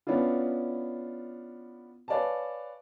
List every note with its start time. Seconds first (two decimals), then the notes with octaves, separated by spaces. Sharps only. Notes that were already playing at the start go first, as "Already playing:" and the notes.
0.07 B3 C#4 D4 E4 F4
2.08 B4 C#5 D5 F5 G#5 A5